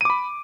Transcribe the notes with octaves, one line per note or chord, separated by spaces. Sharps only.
B5 D6 D#7